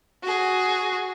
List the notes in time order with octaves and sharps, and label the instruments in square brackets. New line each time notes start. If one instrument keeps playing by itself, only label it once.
[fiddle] F#4 G#4